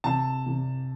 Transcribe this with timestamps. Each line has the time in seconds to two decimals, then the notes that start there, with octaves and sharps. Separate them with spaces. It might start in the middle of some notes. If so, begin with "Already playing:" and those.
0.04 C3 A5
0.46 C3